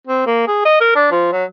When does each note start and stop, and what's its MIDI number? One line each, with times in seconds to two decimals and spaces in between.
0.07 0.22 60
0.26 0.47 58
0.48 0.63 68
0.65 0.80 75
0.81 0.95 70
0.95 1.06 62
1.11 1.28 53
1.32 1.44 54